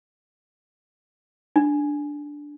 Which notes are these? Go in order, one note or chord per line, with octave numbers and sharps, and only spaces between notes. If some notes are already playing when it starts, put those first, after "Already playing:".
D4